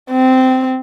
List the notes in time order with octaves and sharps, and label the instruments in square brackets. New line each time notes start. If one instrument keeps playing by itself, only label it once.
[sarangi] C4